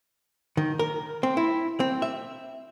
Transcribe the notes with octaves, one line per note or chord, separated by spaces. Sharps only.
D#3
A#4
C4
E4
C4
E5